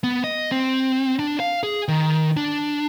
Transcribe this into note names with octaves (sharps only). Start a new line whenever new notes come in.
B3
D#5
C4
D4
F5
G#4
D#3
D4